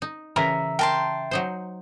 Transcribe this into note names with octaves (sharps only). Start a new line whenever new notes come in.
D#4
C#3 E3 A#4 E5 A#5
A#4 G5 A5 C6
F#3 D#4 C5